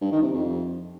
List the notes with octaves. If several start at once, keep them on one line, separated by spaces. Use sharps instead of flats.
G2
D#3
C3
F2